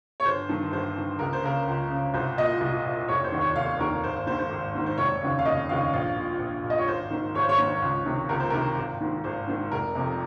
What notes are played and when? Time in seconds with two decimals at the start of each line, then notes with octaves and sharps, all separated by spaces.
0.20 C#5
0.25 G1 C5
0.49 G2 D#3
0.72 G1 C5
0.96 G2 D#3
1.19 C#2 A#4
1.33 C5
1.43 C#3 A#4
1.67 C#2
1.90 C#3
2.14 C2 C5
2.38 A#2 D#5
2.61 C2
2.86 A#2
3.08 F1 C#5
3.24 C5
3.32 D#2 D#3
3.41 C#5
3.56 F1 F5
3.79 D#2 D#3 A#4
4.04 G#1 C5
4.16 C5
4.27 G#2 D#3 C5
4.39 C5
4.50 G#1
4.75 G#2 D#3
4.86 C5
4.98 F1 C#5
5.22 D#2 C#3
5.39 F5
5.45 F1 D#5
5.69 D#2 C#3 F5
5.93 A#1 F5
6.16 A#2
6.40 A#1
6.64 A#2
6.70 D#5
6.78 C#5
6.88 G#1 C5
7.11 G#2 D#3
7.35 G#1 C#5
7.42 C5
7.49 C#5
7.58 G#2 D#3
7.82 C#2
8.06 C3 D#3
8.29 C#2 A#4
8.40 C5
8.50 C3 D#3 A#4
8.77 G#1
9.01 G#2 D#3
9.24 G#1 C5
9.47 G#2 D#3
9.71 F1 A#4
9.95 F2 C3